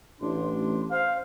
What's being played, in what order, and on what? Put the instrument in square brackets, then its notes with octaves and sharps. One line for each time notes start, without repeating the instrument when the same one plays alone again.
[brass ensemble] A1 [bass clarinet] D4 [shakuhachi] C6
[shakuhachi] C5 [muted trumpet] F5